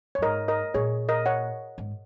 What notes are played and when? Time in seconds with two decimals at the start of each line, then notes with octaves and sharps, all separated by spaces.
0.15 C#5
0.18 F#2
0.22 G#2 A#4 D#5
0.48 A#4 D#5
0.74 A#2 G#4 C#5
1.09 A#4 D#5
1.26 C#5 F#5
1.78 G#2